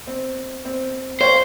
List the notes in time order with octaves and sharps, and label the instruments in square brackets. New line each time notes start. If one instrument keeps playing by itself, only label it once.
[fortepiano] C4
C4
[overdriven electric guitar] C5 [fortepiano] C#5 F5 G5